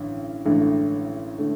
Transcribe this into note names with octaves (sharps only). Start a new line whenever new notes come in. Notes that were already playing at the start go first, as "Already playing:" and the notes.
Already playing: A1 G2 D3
A1 G2 D3 A3
D3 A3